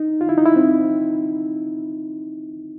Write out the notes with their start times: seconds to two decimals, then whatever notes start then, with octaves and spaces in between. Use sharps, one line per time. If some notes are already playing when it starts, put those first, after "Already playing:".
Already playing: D#4
0.21 F4
0.29 E4
0.38 D#4
0.46 E4
0.56 C4